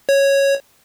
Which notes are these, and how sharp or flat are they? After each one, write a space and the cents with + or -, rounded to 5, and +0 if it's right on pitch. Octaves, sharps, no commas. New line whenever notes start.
C#5 -5